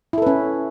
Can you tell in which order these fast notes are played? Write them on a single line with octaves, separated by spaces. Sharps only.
E4 A4 B4 C#4